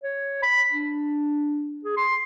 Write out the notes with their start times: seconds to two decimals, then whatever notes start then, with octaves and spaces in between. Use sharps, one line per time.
0.03 C#5
0.43 B5
0.72 D4
1.84 G#4
1.97 C6